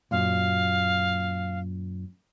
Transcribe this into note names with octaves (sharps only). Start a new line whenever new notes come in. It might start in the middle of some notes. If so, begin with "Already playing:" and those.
F#2 A#2 F5